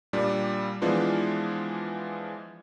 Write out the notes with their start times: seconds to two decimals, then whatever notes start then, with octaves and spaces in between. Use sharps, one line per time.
0.13 A#2 G3 D4
0.82 E3 F3 G#3 B3 D4 F4